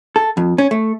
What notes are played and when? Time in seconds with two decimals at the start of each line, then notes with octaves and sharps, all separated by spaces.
0.16 A4
0.37 F2
0.58 C#4
0.71 A3